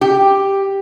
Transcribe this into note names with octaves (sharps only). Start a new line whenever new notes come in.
G4